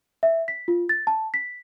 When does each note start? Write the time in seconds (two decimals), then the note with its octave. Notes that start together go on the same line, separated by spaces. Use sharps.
0.23 E5
0.48 B6
0.68 F4
0.89 A6
1.07 A5
1.34 B6